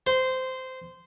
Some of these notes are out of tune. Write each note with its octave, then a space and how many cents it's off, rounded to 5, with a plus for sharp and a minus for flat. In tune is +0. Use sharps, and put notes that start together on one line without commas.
C5 -15